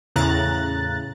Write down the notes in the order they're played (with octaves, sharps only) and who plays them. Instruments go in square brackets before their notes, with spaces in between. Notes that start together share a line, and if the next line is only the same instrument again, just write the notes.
[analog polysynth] E2 A2 C#3 A#5 F#6 A6